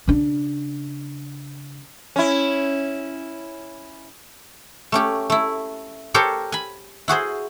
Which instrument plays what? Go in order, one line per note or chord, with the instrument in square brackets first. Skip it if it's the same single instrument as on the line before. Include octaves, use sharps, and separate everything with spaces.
[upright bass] C#3 D4
[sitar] C#4 E4
[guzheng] A3 C#4 G4
A3 E4
G4 A4 A#4 C5 C#5
G#5 B5
E4 F#4 G#4 C5